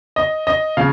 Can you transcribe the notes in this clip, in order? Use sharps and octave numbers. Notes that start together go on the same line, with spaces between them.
D#5
D#5
C#3 F3 F5